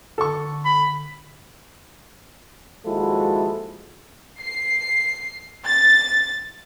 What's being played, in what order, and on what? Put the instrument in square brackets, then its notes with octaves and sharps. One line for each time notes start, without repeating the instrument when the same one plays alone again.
[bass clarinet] D3 [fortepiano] A4 C#6
[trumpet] B5
[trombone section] D#2 F3 G#3 E4 F#4 A4
[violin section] C7
A6